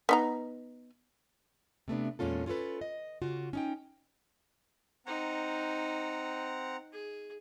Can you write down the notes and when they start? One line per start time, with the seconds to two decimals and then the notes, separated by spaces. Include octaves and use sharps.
0.09 B3 D#4 A#5
1.88 C3 A3 B3 D4
2.19 E2 A#2 G#3 C#4 F4 A4
2.46 C#4 F4 F#4 A4 B4
2.81 D#5
3.22 C#3 F4 F#4
3.53 C#4 D#4 G5
5.06 C4 D#4 F#5 A#5
6.92 G#4